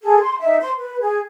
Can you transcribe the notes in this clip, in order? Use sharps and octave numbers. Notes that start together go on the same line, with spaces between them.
G#4 A4
C6
D#4 E5
C5 C6
B4
G#4